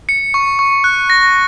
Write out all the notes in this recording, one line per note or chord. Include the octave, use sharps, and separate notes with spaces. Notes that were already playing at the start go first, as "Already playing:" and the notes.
C#7
C#6
C#6
F#6
A#6